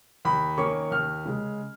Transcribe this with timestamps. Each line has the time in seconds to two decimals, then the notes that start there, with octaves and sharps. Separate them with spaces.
0.25 D#2 B5
0.57 D#3 A#3 C#4 C#6
0.91 D#2 F6
1.25 C#3 G#3